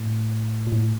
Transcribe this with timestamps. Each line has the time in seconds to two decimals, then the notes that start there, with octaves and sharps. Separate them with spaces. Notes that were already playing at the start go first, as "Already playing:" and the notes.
Already playing: A2
0.67 A#2
0.72 A2